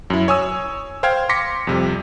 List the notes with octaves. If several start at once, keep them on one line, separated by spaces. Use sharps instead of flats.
F#2 E4
C#5 G#5 D#6 E6
C5 F5 G5 F6 G#6
C6 D6 A#6 B6 C#7
F2 C3 G3